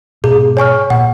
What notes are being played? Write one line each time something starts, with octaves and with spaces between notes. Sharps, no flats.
G#2 B2 G#4
C#5 G#5 C#6 F6
A#2 F#5